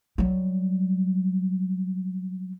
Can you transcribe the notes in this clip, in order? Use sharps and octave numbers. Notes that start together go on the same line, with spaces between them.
F#3 G3